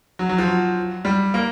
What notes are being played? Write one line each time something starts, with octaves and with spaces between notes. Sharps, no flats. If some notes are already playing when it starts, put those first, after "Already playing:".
F#3
F#3
F3
F#3
G3
A#3